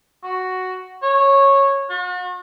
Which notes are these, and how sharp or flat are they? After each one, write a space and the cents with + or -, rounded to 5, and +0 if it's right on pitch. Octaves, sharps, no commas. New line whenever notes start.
F#4 +5
C#5 -10
F#4 -40